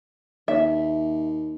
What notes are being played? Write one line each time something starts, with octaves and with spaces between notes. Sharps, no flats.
D#2 E5